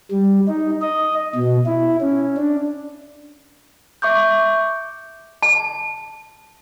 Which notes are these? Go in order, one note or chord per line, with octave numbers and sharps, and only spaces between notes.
G3
D#4
D#5
B2
E4
C#4
D4
E5 C#6 D6 G6
A5